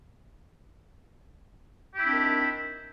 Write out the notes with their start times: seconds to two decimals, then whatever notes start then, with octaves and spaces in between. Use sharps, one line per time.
1.94 G4
1.98 E4
2.02 C4
2.07 D4
2.11 D#3